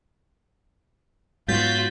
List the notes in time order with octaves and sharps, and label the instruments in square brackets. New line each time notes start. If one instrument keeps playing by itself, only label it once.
[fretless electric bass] G#2 F#3 B3 [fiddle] F4 F#4 [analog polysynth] G6 A6 B6